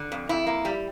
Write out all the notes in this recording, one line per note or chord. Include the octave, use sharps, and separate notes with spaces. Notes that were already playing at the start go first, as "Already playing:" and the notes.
Already playing: D3
F2
F2 E4
A#3
G3